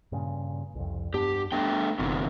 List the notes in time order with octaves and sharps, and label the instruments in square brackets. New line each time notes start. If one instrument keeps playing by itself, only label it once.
[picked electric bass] G2 A#2 C#3
C2 F2
[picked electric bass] G2 B3 D4 [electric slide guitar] G4
[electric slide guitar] A3 D4 G5 [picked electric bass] B3
[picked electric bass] F#1 [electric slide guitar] B2 D#3 C4